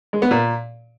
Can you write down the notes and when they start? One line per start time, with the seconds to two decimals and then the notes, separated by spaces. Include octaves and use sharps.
0.13 G#3
0.22 B3
0.31 A#2